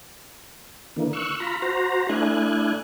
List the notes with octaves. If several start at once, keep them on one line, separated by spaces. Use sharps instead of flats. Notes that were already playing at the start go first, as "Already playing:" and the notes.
D3 E3 A#3
C#6 E6 F#6
F4 A#5 B5
F#4 C5 A#5
A3 D4 E4 G#5 F#6